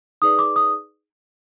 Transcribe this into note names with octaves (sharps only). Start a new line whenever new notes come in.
D#4 G#4 B4 D5 D#6
D6
D#6